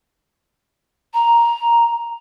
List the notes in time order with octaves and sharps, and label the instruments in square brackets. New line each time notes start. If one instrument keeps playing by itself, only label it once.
[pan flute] A#5